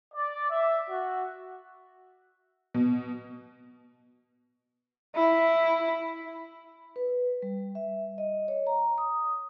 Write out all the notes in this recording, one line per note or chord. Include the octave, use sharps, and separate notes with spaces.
D5
E5
F#4
B2
E4
B4
G3
E5
D#5
C#5
A#5
D#6